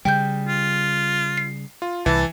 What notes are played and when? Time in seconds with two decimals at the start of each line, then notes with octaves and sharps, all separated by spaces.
0.05 C#3 G3 G5 G6
0.48 F4
1.37 C7
1.82 F4
2.06 C2 E3 A5